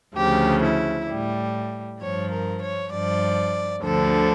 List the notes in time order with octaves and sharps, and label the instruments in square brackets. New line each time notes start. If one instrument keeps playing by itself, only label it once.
[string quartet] D2 C#3 F3 G4
E4
A2 G3
G2 F3 C#5
A#4
C#5
G2 F3 D5
D2 D3 F3 A4